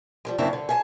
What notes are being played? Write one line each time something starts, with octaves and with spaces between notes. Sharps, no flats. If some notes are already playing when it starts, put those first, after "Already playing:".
F3 G3 G#3
F#2 C#3 A#3 C4 D4 E4
D3
G#4 E5 A5